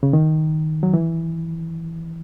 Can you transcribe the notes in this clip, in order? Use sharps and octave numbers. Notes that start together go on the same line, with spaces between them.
C#3
D#3
F#3
E3